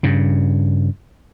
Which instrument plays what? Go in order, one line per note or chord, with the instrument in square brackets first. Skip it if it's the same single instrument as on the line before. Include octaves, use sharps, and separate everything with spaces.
[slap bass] G2 C#3